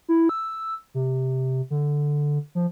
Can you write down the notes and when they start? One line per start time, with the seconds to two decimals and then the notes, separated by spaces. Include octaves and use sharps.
0.09 E4
0.29 E6
0.94 C3
1.70 D3
2.55 F3